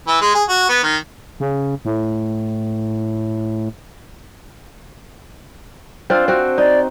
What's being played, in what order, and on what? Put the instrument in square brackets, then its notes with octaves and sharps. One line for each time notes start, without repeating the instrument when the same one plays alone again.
[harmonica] E3
G#3
G#4
F#4
B3
D#3
[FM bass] C#3
A2
[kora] C4 D4 F4
C4 F#4
[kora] D#4 [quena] D5